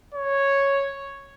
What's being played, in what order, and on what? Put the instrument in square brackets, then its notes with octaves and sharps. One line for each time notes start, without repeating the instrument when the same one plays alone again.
[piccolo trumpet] C#5